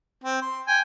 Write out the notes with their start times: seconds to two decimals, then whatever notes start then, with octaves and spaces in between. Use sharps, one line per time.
0.24 C4
0.42 C6
0.67 G5 G#5